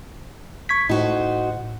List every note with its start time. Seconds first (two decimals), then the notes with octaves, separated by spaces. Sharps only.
0.69 C#6 G#6 B6
0.89 A2 D#4 F#4 C5